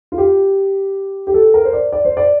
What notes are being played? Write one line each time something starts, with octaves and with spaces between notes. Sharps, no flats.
F4
G4
G4
A4
A#4
C5
D5
D5
C5
D5